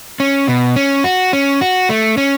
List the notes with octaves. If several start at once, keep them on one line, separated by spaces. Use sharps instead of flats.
C#4
B2
C#4
F#4
C#4
F#4
A3
C#4